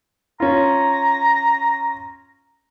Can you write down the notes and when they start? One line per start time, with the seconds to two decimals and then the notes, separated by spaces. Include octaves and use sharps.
0.40 C#4 F4 A#5